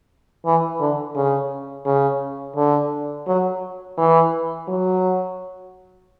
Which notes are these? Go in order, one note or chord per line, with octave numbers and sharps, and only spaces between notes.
E3
D3
C#3
C#3
D3
F#3
E3
F#3